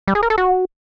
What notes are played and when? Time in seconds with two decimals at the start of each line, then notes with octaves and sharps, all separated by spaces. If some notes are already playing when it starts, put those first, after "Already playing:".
0.08 G3
0.15 G#4
0.23 A#4
0.30 A4
0.38 F#4